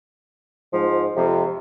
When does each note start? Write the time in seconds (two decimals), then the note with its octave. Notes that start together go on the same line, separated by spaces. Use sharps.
0.73 G#2 F3
1.16 F2 C3